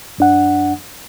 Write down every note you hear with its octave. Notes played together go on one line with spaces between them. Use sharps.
F#2 D4 F#5